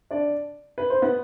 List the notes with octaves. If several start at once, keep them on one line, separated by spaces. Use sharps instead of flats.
D4 D5
B4
C5
B3 B4